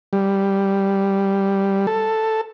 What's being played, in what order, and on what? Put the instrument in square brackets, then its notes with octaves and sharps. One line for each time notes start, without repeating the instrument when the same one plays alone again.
[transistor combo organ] G3
A4